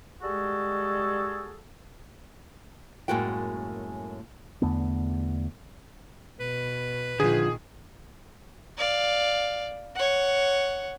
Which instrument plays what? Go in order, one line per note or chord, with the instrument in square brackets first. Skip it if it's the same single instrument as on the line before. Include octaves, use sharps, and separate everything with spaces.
[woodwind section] G3 G#3 F#4 G#4 A4
[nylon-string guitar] F#2 A2 G#3 A#3 F#4 G5
[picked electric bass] E2 D3 A3 B3
[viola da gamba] B2 [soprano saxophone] B4
[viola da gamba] A#2 D#3 [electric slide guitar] D3 F3 [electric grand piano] G#4
[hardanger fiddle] D5 F5
C#5 F#5